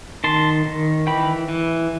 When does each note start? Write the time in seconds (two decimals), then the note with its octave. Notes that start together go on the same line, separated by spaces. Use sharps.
0.24 D#3 A5 C6
0.66 D#3
1.07 E3 G5 B5
1.49 E3